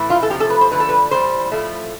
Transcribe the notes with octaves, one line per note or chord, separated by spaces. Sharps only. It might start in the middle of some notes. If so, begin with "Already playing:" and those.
Already playing: A2 E3 A3
F4
A4
C3 F3 A3 G4
A4
B4
C5
D3 F3 A3 B4
A4
B4
A2 E3 G3 C5
A2 F3 A3